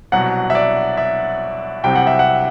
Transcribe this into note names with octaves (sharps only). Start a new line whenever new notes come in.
C2 B2 F#3 F#5
E5
D5
E5
C2 C3 F#3 G5
F#5
E5
F#5